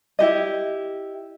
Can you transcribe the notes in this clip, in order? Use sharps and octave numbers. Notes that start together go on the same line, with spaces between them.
E4 G4 D#5